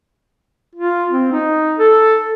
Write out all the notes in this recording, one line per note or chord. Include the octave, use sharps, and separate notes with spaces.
F4
C4
D#4
A4